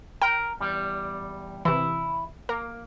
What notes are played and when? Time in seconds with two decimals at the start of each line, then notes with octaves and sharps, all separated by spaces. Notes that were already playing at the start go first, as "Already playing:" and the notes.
0.22 A#4 G5
0.60 E2 G3
1.65 C3 E3 E4
2.49 A#3 A#4